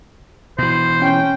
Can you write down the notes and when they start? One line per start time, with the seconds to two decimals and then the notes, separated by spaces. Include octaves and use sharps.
0.58 B2 E3 C5
1.00 C#4 G5